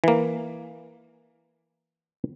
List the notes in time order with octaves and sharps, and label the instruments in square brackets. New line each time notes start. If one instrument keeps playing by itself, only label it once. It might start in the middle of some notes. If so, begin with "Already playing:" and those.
[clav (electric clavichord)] E3 A#3